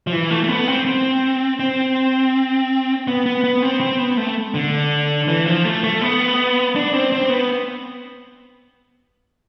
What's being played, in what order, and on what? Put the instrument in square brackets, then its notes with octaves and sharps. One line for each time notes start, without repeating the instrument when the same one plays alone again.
[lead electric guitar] F3
E3
A3
A3
B3
C4
C4
C4
B3
B3
B3
C4
C4
B3
A3
D3
E3
F3
A3
A3
B3
D4
C4
C4
B3